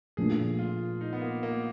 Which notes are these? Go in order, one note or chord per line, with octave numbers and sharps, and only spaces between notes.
A#2 F3 A3 D4 G#4
F4
D#4
B3
A#3
A#3